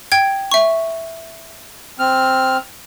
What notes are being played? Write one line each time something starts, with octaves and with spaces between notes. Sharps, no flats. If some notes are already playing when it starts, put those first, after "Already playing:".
G5 G#6
E5 C#6
C4 F6